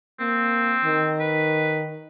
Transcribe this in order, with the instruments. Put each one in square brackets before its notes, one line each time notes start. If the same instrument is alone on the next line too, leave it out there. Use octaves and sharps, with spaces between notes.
[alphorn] A#3 [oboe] C4
[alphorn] D#3
[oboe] B4